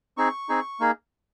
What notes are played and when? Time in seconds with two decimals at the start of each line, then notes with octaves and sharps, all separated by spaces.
0.17 C4 D#4 G#4 C#6
0.49 C4 D#4 G#4
0.80 A#3 D#4 G#4